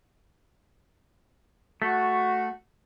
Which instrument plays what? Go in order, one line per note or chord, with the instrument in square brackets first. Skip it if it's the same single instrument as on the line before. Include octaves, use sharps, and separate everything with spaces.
[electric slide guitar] A3 [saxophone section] F#4